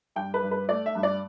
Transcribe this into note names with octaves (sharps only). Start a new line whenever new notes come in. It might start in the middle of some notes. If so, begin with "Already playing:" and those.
G2 G5
B4
G2
B4
A3 D5
E5
G2
D5